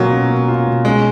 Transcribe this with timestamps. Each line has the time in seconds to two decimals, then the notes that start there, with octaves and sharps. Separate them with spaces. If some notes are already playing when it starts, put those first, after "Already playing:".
Already playing: B2 F#3 A#3 C#4 F4
0.10 C#4
0.29 A#3
0.48 F4
0.67 B2
0.85 G#3 C#4